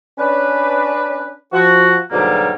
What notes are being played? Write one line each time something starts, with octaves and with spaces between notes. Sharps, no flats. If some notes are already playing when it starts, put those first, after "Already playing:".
C#4 D4 B4
F3 F#4
G#2 B2 D3 F#3 G3 A#3